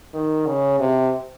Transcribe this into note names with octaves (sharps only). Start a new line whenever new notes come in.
D#3
C#3
C3